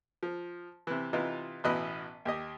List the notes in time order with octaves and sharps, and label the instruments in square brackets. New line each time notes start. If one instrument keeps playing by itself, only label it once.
[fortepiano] F3
C3 E3
C3 E3 D#4 F4
A1 B2 E3 D#5 B5
D#2 G4 D#5